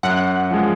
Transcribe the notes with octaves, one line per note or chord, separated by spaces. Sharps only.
F#2 F#5
F3 G#3